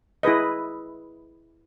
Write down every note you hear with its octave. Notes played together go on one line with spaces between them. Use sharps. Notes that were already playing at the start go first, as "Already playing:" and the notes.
E4 G#4 B4 D#5